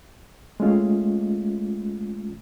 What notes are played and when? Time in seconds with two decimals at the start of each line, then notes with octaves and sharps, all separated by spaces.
0.60 G#3 A3 C#4 F4